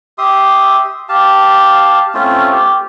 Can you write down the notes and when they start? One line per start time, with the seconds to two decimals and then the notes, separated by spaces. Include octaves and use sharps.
0.18 G4 E5 C6 D#6
1.09 G4 F5 A5
2.14 A3 C4 C#4 F4
2.52 G4